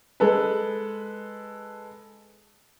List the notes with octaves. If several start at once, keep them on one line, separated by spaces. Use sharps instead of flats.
G#3 A4 B4